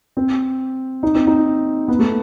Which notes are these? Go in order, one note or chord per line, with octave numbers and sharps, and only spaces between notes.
C4
D#4
C4
D#4
B3
A3